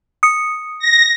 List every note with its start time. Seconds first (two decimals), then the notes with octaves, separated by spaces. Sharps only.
0.23 D#6 C#7
0.79 A#6